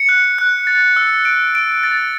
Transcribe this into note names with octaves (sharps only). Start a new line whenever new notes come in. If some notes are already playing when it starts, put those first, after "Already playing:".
Already playing: C#7
F#6
F#6
A6
E6
D7
D7
A6